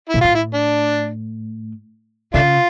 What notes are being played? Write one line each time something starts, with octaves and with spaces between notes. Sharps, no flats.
A#2 E4
A2 F4
E4
D4
C#3 A3 D4 F4